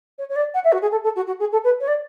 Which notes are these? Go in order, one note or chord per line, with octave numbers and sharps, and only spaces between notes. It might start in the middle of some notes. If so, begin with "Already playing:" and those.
C#5
C#5
D5
F#5
E5
F#4
G#4
A4
A4
F#4
F#4
G#4
A4
B4
C#5
D5